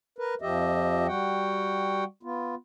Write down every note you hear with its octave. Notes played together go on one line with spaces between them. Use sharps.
A#4 B4
F2 F3 G4 D#5 E5
G3 F#4 F#5 G5
B3 F4